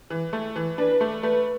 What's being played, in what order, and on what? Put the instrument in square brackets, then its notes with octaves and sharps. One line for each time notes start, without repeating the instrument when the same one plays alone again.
[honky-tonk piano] E3
A3
E3
[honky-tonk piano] D4 [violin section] B4
[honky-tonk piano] A3
[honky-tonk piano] A3 [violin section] B4